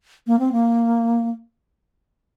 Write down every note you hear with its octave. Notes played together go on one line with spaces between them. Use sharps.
A#3
C4
A#3